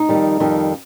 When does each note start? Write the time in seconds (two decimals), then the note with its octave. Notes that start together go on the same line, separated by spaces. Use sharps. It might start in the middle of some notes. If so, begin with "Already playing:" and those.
Already playing: D#4
0.09 F2 D#3 G3
0.40 F2 D#3 G3